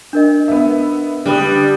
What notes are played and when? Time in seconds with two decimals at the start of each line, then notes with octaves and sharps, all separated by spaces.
0.13 D4 A#4 D#5
0.48 B3 E5
1.26 D3 G3 B4 D#6